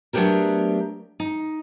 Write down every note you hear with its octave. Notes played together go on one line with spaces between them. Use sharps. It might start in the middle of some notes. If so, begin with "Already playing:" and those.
F#3 A3 B3 D4 G4 A#4
D#4